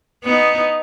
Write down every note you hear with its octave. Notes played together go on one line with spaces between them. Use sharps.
B3 D#4